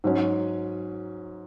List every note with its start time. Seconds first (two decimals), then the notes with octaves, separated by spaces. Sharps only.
0.04 G#2 F#3 C#4